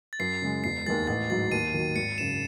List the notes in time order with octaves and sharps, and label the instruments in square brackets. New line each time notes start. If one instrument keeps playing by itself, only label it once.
[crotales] A6
[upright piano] F#2 [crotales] C7
[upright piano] C#3 G#3
[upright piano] E1 [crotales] C7
[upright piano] D#2 D#3 G#3 [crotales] A6
[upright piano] A1 [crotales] A6
[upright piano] G#2 F#3 [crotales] A6
[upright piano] D#2 [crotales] D#7
[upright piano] D#3 F#3
[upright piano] G#1 [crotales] C#7
[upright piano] F#2 C#3 [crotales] E7